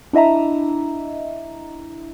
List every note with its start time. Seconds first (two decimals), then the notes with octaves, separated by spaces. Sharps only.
0.13 D4 E4 D#5 E5 A#5